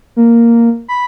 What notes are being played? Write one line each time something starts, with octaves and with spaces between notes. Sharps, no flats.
A#3
B5